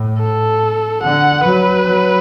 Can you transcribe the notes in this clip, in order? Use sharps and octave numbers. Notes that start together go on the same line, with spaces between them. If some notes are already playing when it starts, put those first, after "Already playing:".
Already playing: A2
A4
D3 F#5
F#3 B4
F#3